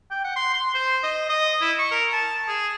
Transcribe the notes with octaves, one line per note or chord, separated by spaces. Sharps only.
G5
F#5
C6
C6
C5
D#5
D#5
E4
C#6
A#4
A5
G#4